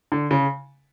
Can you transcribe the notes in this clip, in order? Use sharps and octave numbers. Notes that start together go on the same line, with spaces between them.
D3
C#3